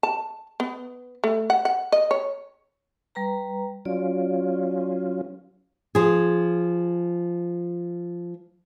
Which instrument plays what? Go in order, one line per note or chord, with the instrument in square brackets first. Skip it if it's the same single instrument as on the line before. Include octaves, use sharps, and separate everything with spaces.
[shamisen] A5
B3
A3
F#5
F#5
D#5
C#5
[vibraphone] G3 B4 A#5
[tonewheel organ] F#3 C#4 F4 [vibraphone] D5
[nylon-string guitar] F3 G#4